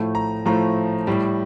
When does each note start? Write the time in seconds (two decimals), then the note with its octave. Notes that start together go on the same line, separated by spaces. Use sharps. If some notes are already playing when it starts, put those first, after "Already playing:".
Already playing: A2 F3 A3
0.15 A#5
0.45 A2 F3 A3 A#5
1.07 A2 G3